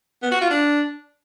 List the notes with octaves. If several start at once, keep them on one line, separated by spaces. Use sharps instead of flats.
B3
F#4
F4
D4